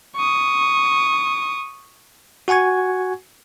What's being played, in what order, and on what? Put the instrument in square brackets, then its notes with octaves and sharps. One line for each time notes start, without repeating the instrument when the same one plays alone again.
[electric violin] C#6 D#6
[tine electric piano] F#4 F#5 G#5 C#6 G#6